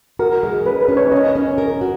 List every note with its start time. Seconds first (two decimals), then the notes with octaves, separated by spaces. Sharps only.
0.19 F#4 A#4
0.43 G#3
0.65 C#4 B4
0.81 B4
0.88 C#4
0.97 C#5
1.11 C#4 D#5
1.35 C#4
1.58 A#4
1.81 F#4